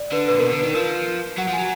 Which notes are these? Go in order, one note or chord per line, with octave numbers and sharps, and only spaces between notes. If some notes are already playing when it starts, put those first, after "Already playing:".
Already playing: D5
D3 B4
A#2 B4
B2 A#4
D3 B4
D#3
F3 A#4
F#3 F#5
F3
G#5
F#3